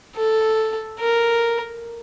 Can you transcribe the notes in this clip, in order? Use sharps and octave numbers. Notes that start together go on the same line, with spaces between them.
A4
A#4